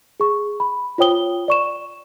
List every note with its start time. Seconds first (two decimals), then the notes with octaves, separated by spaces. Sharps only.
0.20 G#4 C#6
0.60 B5
0.98 F4 C5 C#5 G5 D#6 G7
1.48 D5 C#6 E7